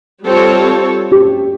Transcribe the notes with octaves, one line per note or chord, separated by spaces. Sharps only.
G3 C4 F4 A4 C#5
G4